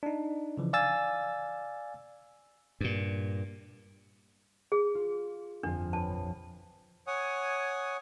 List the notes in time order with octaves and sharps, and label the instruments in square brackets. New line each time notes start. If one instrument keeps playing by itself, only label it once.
[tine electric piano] D4 D#4
C#3 E3 F3
D5 F5 G#5 E6 A6
[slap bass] G2 A#2
[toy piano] G#4
[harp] F4
[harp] G1 F2 F4 [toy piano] D4
[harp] B4 C#5 B5 [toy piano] A5
[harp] A#1 F3
[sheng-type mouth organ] C#5 F#5 G#5 D#6